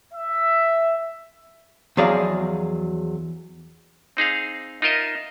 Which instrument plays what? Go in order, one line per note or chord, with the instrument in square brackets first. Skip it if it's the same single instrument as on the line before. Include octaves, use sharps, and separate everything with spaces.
[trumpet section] E5
[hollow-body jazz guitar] E2 F3 F#3 G#4 D5 F5
[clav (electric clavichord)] C4 D#4 G#4 F5
D#4 F4 A#4 D#5 E5